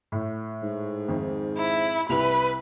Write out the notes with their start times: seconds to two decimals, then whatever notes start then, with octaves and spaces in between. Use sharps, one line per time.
0.12 A2
0.63 G#2
1.08 F2 D#3
1.58 E4
2.09 C2 E4 B4 F7